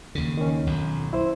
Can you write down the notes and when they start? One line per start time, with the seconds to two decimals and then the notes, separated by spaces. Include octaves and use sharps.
0.15 D#2 C#3
0.37 D#3 C#4
0.67 B1 F2
1.13 E4 C5